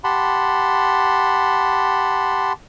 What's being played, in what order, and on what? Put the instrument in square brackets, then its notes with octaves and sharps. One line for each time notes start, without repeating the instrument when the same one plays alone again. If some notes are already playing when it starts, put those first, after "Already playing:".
[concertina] G4 F#5 A5 B5 C6